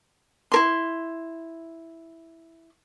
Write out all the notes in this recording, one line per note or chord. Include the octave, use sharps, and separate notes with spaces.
E4 A#4 C6